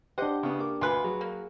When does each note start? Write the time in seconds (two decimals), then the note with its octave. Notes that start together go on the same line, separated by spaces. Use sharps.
0.18 D4 G4 C5 D#5 F#5 D6
0.43 C#3 B3
0.59 A#3 D6
0.81 D2 F4 B4 G#5 C6 F#6
1.04 F#3 G#4
1.21 A#3